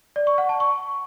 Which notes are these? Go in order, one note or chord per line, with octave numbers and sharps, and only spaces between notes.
D5
C#6
F#5
A5
C#6